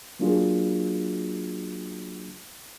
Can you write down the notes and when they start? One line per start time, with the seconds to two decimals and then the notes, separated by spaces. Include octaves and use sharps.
0.19 F#3 A#3 D4 F4 F#4 G#4